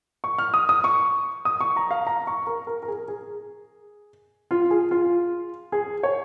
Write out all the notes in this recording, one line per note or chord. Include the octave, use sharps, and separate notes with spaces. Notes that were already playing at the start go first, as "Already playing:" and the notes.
C#6
F6
D#6
D#6
C#6
D#6
C#6
A#5
F5
A#5
C#6
A#4
A#4
A#4
G#4
G#4
F4
G#4
F4
G#4
C#5